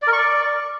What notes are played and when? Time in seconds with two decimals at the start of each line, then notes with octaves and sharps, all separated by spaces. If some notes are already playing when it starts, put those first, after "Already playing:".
0.02 D5
0.07 A#4
0.13 C#6
0.18 D5